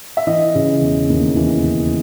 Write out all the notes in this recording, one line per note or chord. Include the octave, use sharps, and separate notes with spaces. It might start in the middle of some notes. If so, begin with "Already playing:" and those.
E5
E3 D#5
C#3
E1
D#2
E3
C#3